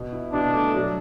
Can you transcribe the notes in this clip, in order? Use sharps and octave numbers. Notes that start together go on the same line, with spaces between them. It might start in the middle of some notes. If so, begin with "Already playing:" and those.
Already playing: B2
E4
B2 D4
A3
F#3